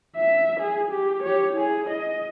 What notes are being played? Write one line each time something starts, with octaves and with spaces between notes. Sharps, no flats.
E5
G#4
G4
G4 C#5
E4 G#4
D#5